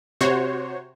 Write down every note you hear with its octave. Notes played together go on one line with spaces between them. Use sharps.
C3 F#4 C5 C#5